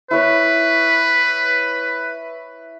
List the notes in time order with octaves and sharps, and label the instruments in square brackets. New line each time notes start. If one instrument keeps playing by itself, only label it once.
[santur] E4 C#5 E5 [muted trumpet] B4